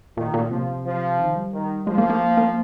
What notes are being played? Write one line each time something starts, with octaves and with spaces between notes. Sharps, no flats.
A#2 D#3
A#2
C3 F3
F3
D#3
G3
D#3
F3 G#3
A#3
A#3
A#3